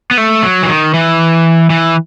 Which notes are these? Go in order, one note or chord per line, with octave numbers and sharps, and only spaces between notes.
B3
A3
F#3
E3
D#3
E3
E3